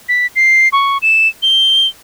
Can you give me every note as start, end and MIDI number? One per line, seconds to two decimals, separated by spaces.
0.09 0.27 95
0.36 0.69 96
0.73 0.98 85
1.02 1.28 100
1.43 1.87 103